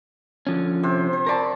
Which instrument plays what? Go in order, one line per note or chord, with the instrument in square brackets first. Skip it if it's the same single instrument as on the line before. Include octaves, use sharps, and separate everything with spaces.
[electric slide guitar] D3 F3 C#4
[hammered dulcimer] C3 C5
C5
[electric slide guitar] A#4 D5 [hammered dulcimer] A5 B5 C#6